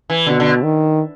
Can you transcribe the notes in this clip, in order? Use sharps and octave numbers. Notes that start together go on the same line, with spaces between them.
E3
B2 D3
D3
D#3